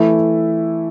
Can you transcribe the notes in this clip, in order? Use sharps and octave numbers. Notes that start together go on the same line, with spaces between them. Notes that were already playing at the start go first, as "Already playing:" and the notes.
Already playing: E3 A3 E4